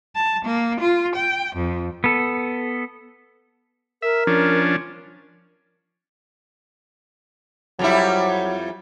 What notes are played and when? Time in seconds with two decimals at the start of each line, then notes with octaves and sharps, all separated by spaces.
0.16 A5
0.46 A#3
0.81 F4
1.15 G5
1.56 F2
2.04 B3 A4
4.02 A#4 E5
4.27 F3 C#4 D4
7.79 F2 F#3 G3 E4